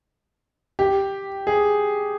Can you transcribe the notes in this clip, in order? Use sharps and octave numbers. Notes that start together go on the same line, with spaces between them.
G4
G#4